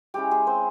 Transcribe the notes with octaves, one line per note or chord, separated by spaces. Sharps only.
G#3 C#4 E4 G4
G#3 G#4
C4 C5